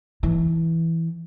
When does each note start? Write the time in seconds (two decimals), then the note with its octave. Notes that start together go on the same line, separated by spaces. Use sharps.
0.23 E3